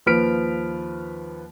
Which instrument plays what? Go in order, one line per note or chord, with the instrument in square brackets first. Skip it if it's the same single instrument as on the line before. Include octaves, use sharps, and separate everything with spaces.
[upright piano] D#2 F3 B4 F6 B6 D7